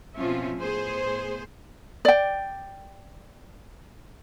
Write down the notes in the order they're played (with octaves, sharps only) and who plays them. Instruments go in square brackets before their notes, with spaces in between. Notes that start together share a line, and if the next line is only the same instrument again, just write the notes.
[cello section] B2 F3 C4 C#4 F4 E5
A2 B3 G#4 C5
[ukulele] D5 G5